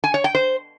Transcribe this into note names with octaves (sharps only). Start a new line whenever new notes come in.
G#5
C#5
G5
C5